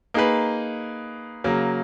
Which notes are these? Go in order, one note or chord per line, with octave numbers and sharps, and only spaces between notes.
A#3 D#4 G#4 B4
C#3 F#3 A#3